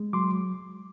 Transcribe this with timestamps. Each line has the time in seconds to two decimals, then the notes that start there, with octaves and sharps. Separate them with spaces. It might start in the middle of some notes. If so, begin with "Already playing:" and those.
Already playing: G#3
0.13 F#3 C6 D6